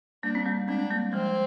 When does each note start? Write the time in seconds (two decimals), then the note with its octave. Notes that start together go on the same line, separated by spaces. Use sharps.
0.23 G3 A#3 D4
0.35 C4
0.46 G3 A#3
0.68 G#3 C4 D4
0.90 G3 A#3
1.13 F3 G#3 C4